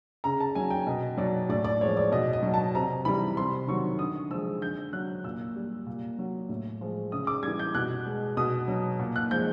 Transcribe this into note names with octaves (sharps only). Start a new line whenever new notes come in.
C#3 A#5
A5
F#3 G#5
G5
B2 D#5
F#3 D5
A2 D5
D5
F3 G#3 C#5
D5
B2 D#5
D#5
F#3
A5
C3 A#5
E3 G3 B5
C3 C6
D#3 F#3 C#6
D3 D#6
F3 G#3 E6
D3 G6
F#3 F#6
A#2 E6
G3
A#2
F#3
A2
F3 G#3
C#3 D#6
D6
E3 G3 G#6
G6
B2 F#6
G#3
B2 D#6
F#3
A#2
F#6
F3 G#3 G6